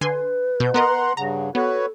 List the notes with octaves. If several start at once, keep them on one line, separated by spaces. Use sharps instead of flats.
D3 B4 G#5 C6
B2 G6
B3 A#4 D#5 F#5 A#5 C6
G2 C#3 F#5 A#5
B3 F#4 A4 B4 C#5